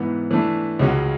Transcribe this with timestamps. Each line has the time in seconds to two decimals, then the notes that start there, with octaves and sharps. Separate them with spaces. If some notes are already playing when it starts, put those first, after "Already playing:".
Already playing: G#2 E3 B3
0.31 E3 A3 D4
0.79 C#2 C#3 G#3 C#4 F#4